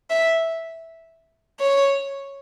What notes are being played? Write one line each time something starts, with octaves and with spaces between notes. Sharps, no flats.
E5
C#5